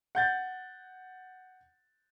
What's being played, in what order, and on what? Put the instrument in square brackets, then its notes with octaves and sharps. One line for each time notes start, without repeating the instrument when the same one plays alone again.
[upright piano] F#5 G6 A6